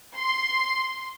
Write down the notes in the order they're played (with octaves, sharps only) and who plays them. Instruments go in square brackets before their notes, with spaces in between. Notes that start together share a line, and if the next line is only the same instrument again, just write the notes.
[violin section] C6